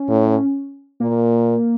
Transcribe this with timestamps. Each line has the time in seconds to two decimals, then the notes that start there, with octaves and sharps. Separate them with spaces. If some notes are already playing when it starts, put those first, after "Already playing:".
Already playing: C#4
0.09 A2
1.00 A#2 A#3